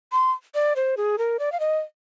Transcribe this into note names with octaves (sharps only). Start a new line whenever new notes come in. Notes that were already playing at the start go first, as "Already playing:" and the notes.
C6
D5
C5
G#4
A#4
D5
F5
D#5